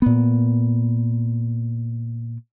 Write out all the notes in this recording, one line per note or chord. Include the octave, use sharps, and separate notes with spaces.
A#2 B3